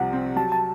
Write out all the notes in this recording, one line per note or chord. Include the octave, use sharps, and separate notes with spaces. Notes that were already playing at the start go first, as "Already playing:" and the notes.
Already playing: C2 C3 F3 F#5
C4
F#3 A5
A5